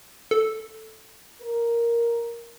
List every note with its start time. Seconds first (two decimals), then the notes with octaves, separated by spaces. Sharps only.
0.31 A4
1.41 A#4